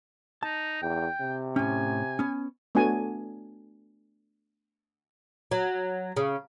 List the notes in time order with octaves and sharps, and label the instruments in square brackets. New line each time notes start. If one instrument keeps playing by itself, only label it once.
[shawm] D#4 [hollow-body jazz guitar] A5
[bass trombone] E2 [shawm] G5
[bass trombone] C3
[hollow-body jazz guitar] A2 C#4 [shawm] G#5
[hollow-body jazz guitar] B3 C#4
[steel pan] A3 B3 D4 F#4 G#5
[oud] F#3
C#3